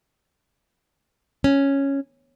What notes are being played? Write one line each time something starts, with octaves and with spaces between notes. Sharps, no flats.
C#4